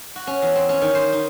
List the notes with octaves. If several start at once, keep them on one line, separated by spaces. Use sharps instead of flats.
F#4
C#4
E2
C4
C#4
D#3
C5
D#4